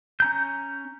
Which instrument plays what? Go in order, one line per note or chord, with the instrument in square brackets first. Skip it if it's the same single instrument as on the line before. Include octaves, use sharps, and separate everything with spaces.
[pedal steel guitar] C#4 A#5 G6